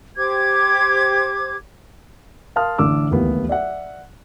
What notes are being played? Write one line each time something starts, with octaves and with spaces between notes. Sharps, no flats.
G4 C5 D6 G#6
A#4 F5 A5 C6 D#6 F6
A1 D3 D4 D6 E6
D1 A1 D#2 B3
D5 E5 F#5